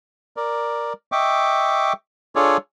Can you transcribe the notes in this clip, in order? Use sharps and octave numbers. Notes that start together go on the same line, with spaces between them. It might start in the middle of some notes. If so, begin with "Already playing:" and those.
A#4 D5
D#5 E5 G5 C#6 D6
D4 F4 G#4 A4 C#5 D5